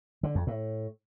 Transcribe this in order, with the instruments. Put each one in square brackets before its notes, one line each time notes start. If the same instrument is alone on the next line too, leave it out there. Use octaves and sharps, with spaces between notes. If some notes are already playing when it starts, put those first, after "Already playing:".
[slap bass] D3
F2
A2